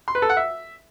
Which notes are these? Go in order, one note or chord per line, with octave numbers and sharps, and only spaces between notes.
C6
B4
A4
F#5
E5